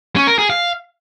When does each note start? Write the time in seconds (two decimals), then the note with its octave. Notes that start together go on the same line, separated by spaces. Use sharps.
0.16 C#4
0.27 A#4
0.39 G#4
0.50 F5